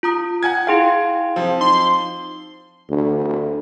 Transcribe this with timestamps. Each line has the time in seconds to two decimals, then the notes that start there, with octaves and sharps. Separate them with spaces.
0.03 F4 A#5 D#6
0.43 F#5 G#5 G#6
0.67 E4 G#4 F5 G5 C6
1.36 F3 C4
1.61 D#4 C6
2.90 D2